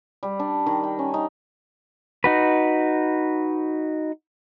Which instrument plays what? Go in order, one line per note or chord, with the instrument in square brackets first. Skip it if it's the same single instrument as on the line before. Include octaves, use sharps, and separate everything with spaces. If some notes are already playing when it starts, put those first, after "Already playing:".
[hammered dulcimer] G3
D4
D#3
G5
C#4
D#4
[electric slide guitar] D#4 F#4 B4